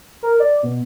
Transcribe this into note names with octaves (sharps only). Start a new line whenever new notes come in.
A#4
D5
B2